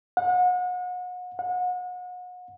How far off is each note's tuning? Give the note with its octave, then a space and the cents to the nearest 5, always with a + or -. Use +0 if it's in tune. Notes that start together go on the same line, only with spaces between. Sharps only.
F#5 -35
F#5 -35